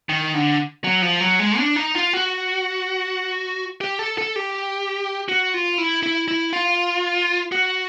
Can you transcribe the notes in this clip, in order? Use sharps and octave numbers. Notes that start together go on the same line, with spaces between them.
D#3
D3
F#3
F3
F#3
G#3
D4
D#4
F4
F#4
G4
A4
A4
G4
F#4
F4
E4
E4
E4
F4
F#4